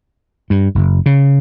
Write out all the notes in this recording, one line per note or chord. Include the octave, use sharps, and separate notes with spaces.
G2
F#1
C#3